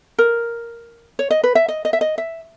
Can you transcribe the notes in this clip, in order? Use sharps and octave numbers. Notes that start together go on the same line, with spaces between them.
A#4
C#5
D#5
B4
E5
D#5
D#5
E5
D#5
E5